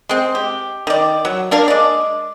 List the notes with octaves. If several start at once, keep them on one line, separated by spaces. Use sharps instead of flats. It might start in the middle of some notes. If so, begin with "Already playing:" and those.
G#3 C4
G4
D#3 D5
F#3
A#3 D4 A#4 F5
G#3 D5